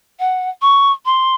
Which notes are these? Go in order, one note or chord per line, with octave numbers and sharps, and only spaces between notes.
F#5
C#6
C6